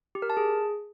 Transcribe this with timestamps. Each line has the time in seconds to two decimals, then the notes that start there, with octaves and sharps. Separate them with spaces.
0.15 G4
0.22 A#4
0.30 A5
0.37 G#4